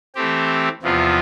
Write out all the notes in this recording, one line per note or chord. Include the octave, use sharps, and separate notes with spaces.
E3 A3 C4 G4
E2 C3 F3 B3 F4